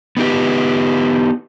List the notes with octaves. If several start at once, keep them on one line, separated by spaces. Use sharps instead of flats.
B3 D#4 G4 B4